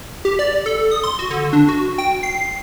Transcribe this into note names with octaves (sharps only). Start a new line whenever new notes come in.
G4
D5
A4
D#6
C6
F#4
D3
D4
F#4
G5
C7